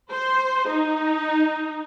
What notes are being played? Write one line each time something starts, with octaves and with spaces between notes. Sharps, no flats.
C5
D#4